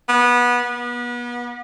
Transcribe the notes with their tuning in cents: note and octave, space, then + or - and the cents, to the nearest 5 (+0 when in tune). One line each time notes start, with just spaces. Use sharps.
B3 -20
B3 -30